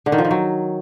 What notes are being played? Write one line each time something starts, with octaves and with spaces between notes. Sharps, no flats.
D3
D#3
F3
D#3
F#3